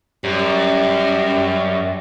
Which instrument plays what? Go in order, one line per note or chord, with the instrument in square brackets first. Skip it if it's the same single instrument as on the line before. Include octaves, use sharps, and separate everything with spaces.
[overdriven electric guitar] F#2 [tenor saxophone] G3